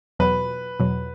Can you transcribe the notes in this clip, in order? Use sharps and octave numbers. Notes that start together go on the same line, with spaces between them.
E2 B2 F#3 B4
E2 B2 F#3